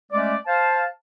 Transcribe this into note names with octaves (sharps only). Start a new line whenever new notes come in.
G#3 A3 C#4 D5
C5 F5 A5